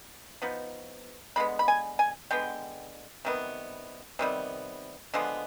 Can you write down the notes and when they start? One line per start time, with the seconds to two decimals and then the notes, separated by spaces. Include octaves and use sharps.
0.42 F3 B3 D#4
1.36 D3 G#3 B3 B5
1.59 B5
1.68 G#5
1.99 G#5
2.31 D3 G#3 B3 G5
3.25 C3 D#3 G3 B3
4.19 C3 D#3 G3 B3
5.14 D3 F3 G#3 B3